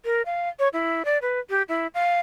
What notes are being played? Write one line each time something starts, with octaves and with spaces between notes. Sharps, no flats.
A#4
F5
C#5
E4
D5
B4
G4
E4
F5